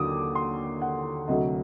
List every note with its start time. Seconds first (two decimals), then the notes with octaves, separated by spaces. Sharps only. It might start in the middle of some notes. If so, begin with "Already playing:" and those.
Already playing: D#2 D3 F#3 D6 D#6
0.35 C6
0.82 F#5
1.28 D2 C3 F#3 A3 D#5